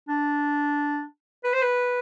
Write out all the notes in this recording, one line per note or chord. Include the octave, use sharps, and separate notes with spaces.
D4
B4
C5
B4